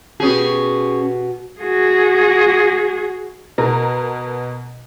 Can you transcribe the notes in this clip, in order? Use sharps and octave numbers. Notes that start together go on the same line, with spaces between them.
B2 C#4 G4 G#4
F#4 G#4
B2 A#4